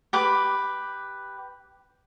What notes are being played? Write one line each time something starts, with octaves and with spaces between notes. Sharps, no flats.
G4 B4 D6